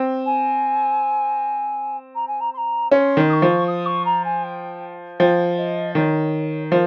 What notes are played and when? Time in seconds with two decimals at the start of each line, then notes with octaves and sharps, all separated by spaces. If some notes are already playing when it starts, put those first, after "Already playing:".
Already playing: C4
0.26 G#5
2.15 A#5
2.28 G#5
2.40 A#5
2.54 C6
2.57 A#5
2.92 C#4 C6
3.17 D#3
3.30 D#6
3.33 C#6
3.42 F3
3.68 D#6
3.86 C#6
4.05 A#5
4.24 G#5
4.44 G5
5.19 F3 G5
5.57 D#5
5.95 D#3 C#5
6.71 F3 A#4